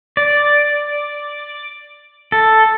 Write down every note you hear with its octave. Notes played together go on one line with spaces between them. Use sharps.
D5
A4